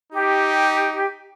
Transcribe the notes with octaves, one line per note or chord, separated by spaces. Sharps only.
D#4 G4